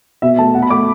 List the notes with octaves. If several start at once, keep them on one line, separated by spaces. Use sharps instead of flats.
B2 E5
A3 A5
B2 F#5
B5
A3 D6